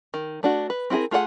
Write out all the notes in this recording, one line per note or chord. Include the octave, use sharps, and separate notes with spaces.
D#3
A3 D4 F#4
B4
C4 E4 F#4 G#4 A#4
A3 F4 G#4 C5 F#5